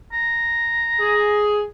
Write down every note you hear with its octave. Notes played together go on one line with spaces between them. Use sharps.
A#5
G#4